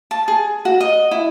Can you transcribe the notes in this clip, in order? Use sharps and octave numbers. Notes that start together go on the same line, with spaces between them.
A5
G#4
F#4
D#5
E4